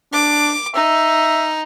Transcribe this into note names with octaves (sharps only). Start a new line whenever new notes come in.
D4 D6
D#4 E5